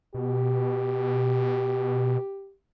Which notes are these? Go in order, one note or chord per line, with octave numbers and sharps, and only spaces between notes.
B2 G4